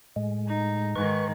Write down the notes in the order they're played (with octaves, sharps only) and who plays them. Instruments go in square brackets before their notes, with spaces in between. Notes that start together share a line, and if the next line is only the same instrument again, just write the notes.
[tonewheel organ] A2 G#3
[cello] D#4
[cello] G#2 D#3 [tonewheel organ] B4 C#6